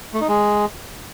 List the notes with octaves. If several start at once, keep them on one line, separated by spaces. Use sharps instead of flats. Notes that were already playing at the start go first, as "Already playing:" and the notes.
A3
D#4
G#3